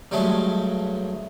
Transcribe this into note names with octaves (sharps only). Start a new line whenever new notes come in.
G2 F#3 G#3 A3